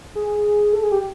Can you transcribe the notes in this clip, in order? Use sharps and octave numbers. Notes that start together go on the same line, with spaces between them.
G#4
A4
G#4
G4